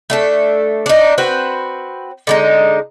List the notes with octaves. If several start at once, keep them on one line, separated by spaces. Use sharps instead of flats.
A3 D4 A4
D4 D#4
C4 F#4 B4 C5
D3 G#3 D#4